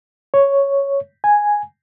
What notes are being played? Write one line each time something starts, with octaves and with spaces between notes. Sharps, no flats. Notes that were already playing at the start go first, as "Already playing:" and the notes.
C#5
G#5